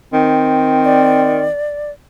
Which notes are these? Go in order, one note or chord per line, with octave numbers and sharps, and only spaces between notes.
D#3 C4
D5